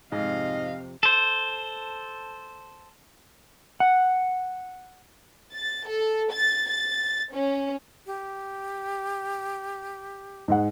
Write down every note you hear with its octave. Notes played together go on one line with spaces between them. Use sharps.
F2 G#2 C3 D#5 F5
A4 C5
F#5
A6
A4
A6
A6
C#4
G4
G#2 G#3 F#5